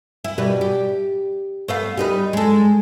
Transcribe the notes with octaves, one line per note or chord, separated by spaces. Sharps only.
E4
B2 G3 B4
G4
A3 B3 F5
G3 D#4 B4
G#3 A4